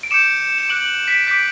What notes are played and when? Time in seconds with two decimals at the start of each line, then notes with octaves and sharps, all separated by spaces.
0.03 D7
0.11 D6 G6 C#7 E7
0.58 E7
0.69 D6 F#6 D7 F#7
1.08 B6 D7
1.27 D6 G6 B6 D7